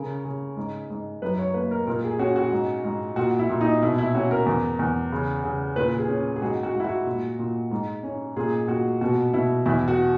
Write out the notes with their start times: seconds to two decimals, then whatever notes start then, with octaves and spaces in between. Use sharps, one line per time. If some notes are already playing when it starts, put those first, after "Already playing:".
Already playing: C#3 C#4 A#4
0.25 C#3
0.57 G#2
0.90 G#2
1.22 F#2 B4
1.39 C#5
1.54 A#3 B4
1.71 A#4
1.87 A#2 A#4
2.04 G#4
2.19 C#4 F#4
2.36 F#4
2.52 G#2
2.84 G#2
3.16 A#2 F#4
3.39 E4
3.50 A#2
3.61 D#4
3.82 B2 E4
3.98 E4
4.15 C#4 F#4
4.31 A#4
4.46 E2
4.79 E2
5.12 C#3
5.44 C#3
5.76 A#2 B4
5.98 G#4
6.08 C#4
6.36 G#4
6.41 G#2 F#4
6.63 F#4
6.74 G#2
6.80 E4
6.84 F#4
7.06 A#2
7.39 A#2
7.71 G#2
8.03 C#4
8.36 A#2 G#4
8.68 A#2 F#4
9.01 B2 F#4
9.33 B2 E4
9.66 E2 E4
9.88 F#4